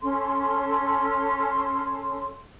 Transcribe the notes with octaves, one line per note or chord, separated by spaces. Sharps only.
C#4 A4 C6